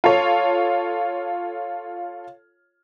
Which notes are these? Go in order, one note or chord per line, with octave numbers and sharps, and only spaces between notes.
F4 A4 C#5